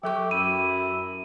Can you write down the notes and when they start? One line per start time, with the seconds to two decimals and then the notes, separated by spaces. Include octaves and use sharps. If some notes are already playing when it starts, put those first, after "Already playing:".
0.03 F#3 G4 A4 C#6
0.31 F#2 E4 D#7